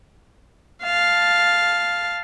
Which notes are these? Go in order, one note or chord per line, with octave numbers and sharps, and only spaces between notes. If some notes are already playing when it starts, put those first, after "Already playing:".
F5 A5